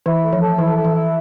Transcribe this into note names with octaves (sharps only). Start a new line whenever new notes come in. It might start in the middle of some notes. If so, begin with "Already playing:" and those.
E3 E4
A3
F3
A4
E3 E4
A4
E3
E4